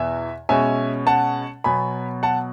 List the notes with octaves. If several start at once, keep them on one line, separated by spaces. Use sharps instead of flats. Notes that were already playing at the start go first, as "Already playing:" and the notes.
Already playing: E2 B2 E5 G#5
B2 G#3 C#4 E5 G#5
F#5 A5
B2 F#3 B3 G#5 B5
F#5 A5